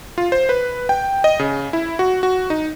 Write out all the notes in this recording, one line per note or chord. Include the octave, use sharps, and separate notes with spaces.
F4
C5
B4
G5
D#5
C#3
E4
F#4
F#4
D#4